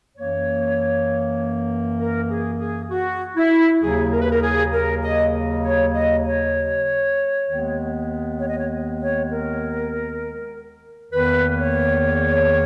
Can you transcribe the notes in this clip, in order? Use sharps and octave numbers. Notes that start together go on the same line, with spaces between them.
F#2 E3 A#3 C#5
A#4
G#4
G#4
F#4
E4
D#2 C#3 F#3 G#4
A#4
B4
A#4
G#4
A#4
D#5
C#5
D#5
C#5
D#2 D#3 G#3 B3
C#5
D#5
C#5
C#5
A#4
E2 D#3 A#3 B4
C#5